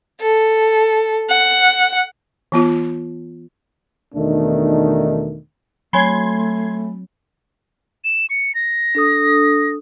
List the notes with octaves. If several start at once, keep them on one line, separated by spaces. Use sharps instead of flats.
A4
F#5
E3 B3 F4
E2 B2 D#3 A3 D4 D#4
F#3 A3 C4 C#5 G#5 B5 C6 G#6
E7
C#7
A#6
D4 A4 D#6